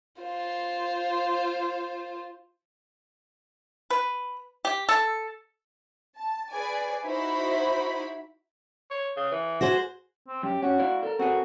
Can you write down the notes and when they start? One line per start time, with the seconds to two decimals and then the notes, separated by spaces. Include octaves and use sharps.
0.21 F4 C5
3.90 B4
4.65 G4
4.89 A4
6.16 A5
6.51 G#4 B4 D5 G#5
7.05 D#4 E4 F#4 C5 E5 B5
8.91 C#5
9.17 C#3
9.32 E3
9.61 F#4 G#4 C5
10.27 C4
10.43 F#2 G4
10.62 C#4 F#4
10.79 E4 D5 F5
11.03 A4 A#4
11.19 C4 F#4 G#4